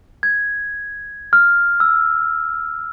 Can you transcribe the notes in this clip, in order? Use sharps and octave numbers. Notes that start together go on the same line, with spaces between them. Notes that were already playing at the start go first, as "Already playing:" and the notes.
G#6
F6
E6